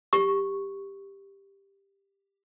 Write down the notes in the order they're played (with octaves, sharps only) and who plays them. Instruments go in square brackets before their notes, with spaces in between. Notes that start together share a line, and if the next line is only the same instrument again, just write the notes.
[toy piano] G4 C#6